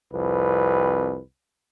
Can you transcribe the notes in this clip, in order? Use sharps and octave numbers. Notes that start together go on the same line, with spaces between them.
C2 F2 B4